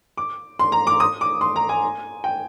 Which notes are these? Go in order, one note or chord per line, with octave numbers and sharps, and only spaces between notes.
D6
C6
A#5
D6
D#6
D6
C6
A#5
G#5
G5